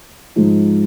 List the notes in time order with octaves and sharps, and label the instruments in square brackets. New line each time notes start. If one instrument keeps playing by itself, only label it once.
[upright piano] G#2 F3 G#3 D#4